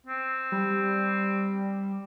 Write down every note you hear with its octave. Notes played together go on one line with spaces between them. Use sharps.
C4
G3